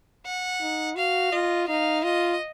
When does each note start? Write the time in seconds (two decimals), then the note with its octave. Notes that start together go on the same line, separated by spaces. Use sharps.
0.25 F#5
0.61 D#4
0.96 F#4 F5
1.32 F4 D#5
1.68 D#4 F5
2.04 F4 D#5